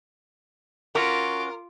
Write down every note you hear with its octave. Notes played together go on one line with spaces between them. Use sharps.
C#4 F4 F#4 A#4 D6